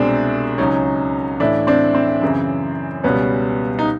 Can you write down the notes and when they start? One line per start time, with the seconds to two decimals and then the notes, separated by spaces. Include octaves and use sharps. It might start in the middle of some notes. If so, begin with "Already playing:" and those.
Already playing: C2 B2 G#3 C4 D4
0.58 C#2 C#3 F#3 C#4 D#4
1.40 A2 E3 A3 D4 E4
1.67 C4 D4
1.95 C4
2.22 F#2 C#3 E3
3.04 C#2 B2 G3 B3 C#4
3.79 D#4